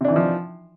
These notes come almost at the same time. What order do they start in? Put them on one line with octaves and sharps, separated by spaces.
C3 D4 E3 D#4 F3